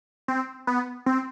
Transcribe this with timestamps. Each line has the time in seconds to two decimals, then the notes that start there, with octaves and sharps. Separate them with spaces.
0.28 C4
0.67 B3
1.06 C4